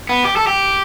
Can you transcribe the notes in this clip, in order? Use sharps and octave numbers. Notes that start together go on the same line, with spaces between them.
B3
G4
A4
G4